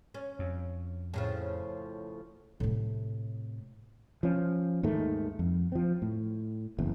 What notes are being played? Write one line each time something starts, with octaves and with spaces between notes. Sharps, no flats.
C#4
F2
A2 C#3 F3
A2 C3
F3 C#4
D#2 G#2 D#3 A3
F2
F3 C4
A2
F#1 E2